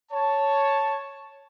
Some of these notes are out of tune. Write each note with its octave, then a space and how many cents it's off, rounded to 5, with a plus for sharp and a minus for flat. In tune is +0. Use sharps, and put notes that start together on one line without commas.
C#5 +0 A5 +0